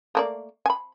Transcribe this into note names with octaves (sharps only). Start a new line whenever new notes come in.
A3 A#3 D5
G#5 B5